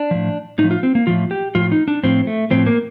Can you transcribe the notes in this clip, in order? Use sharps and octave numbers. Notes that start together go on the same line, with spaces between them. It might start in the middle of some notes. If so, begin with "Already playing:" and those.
Already playing: D4
A2 F3
A2 D#4
F3
F4
C4
A#3
A2 F3 F4
G4
A2 F3 F4
D#4
D4
A2 F3 C4
A3
A2 F3 C4
A#3